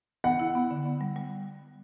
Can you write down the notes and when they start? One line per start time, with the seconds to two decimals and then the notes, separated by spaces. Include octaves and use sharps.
0.24 B3 F#5
0.39 E4
0.55 B3
0.71 D3
0.86 B3
1.01 G3
1.16 G3